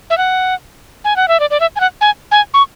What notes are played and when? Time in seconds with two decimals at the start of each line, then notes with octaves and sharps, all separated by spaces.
0.10 E5
0.18 F#5
1.05 G#5
1.16 F#5
1.28 E5
1.40 D5
1.51 D5
1.60 E5
1.76 G#5
1.80 F#5
2.01 G#5
2.31 G#5
2.54 C#6